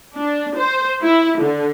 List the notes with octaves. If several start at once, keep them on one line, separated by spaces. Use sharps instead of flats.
D4
C5
E4
D3